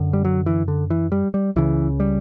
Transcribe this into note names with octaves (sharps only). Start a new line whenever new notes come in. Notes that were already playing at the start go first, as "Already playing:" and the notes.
Already playing: F#2 D3
G3
F#3
E3
D3
E3
G3
G3
C#2 C#3 E3
G3